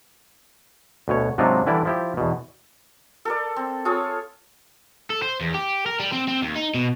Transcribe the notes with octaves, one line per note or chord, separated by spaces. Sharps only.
D2 B2 C#5
G#2 C3 F#3 D4 D#4 F4
D3 E3 G3 E4 D5
F3 E4 G4
E2 B2
A4 A#4 D5
C4
F4 G#4 A4 C#5
A4
C5
E2
G4
A#4
G3
C4
C4
D#2
D#4
B2